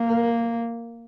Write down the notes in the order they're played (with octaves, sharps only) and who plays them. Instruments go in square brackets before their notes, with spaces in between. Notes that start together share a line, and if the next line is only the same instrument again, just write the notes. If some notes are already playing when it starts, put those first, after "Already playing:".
Already playing: [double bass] A#3